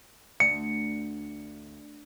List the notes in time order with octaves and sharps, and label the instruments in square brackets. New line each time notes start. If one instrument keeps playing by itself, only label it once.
[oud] D2 [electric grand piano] C#7